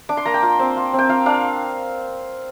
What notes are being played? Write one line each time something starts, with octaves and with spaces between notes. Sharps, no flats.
D4 D6
C6
A#3 A#5
G5
F4
C4
F4
C4
G5
F4 F5
D4 F5